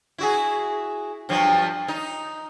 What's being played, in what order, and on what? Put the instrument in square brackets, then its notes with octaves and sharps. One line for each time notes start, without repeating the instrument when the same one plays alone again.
[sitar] E4 F#4 G#4
G2 F3 F#3
D#4